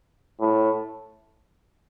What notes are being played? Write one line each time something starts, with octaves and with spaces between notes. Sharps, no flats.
A2